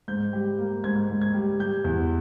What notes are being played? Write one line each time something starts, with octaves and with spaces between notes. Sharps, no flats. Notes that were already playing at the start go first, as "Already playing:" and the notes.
G#2 G6
G3
A#3
G#2 G#6
G#2
G#6
G3
G3 G6
E2